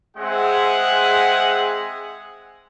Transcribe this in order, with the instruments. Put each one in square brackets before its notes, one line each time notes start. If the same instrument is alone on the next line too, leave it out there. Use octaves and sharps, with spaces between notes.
[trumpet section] G#3 C4 G#4 E5 F#5